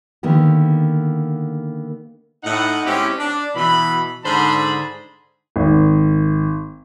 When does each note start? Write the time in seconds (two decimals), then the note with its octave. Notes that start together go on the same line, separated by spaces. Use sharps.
0.23 D3 D#3 A#3 B3 G4
2.44 A2 D#4 F#5
2.85 G#3 C4 C#4 E4 G4
3.18 D4
3.55 B2 E3 B5
4.24 G#2 D3 G#4 C5 A5 B5
5.56 G#1